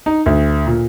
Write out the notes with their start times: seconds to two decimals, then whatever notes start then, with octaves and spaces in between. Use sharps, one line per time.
0.06 D#4
0.26 D2
0.67 A#2